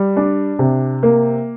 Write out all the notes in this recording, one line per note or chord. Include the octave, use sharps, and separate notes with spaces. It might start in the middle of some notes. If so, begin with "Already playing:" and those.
Already playing: G3
D4
C3
A#3